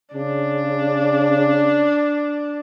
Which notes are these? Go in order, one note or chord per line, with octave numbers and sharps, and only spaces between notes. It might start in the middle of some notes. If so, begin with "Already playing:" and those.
C#3 D4